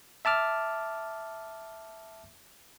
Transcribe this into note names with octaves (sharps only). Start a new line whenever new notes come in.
E5 A5 D6 F6